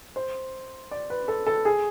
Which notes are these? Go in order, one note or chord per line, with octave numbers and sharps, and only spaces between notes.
C5
D5
B4
A4
A4
G#4